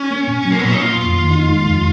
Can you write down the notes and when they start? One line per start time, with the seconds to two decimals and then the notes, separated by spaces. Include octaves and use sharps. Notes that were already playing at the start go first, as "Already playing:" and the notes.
Already playing: C#4
0.11 A#3
0.28 A#2
0.45 F#3
0.51 A#3
0.59 B3
0.62 A#2 C#4
0.72 D#4
0.79 A#3 F4
0.96 F2
1.14 D#3
1.31 D#4
1.49 G#3
1.66 F2